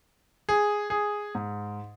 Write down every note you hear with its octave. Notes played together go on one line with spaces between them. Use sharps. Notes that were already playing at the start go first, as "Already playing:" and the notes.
G#4
G#4
G#2